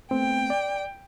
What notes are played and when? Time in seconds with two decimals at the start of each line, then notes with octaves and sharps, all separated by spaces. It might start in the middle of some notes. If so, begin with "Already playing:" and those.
0.11 A3 B3 C4 G5
0.50 D5